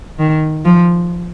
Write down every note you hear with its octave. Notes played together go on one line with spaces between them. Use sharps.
D#3
F3